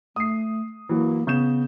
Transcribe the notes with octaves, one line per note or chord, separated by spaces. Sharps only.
A3 D#6 C7
E3 F#3 A#3
C#3 B3 G6 E7